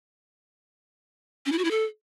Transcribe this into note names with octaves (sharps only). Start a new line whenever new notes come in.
C#4
E4
F#4
E4
A4